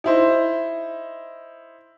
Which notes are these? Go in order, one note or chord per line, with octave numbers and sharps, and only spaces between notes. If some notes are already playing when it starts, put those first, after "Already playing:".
D#4 E4 C5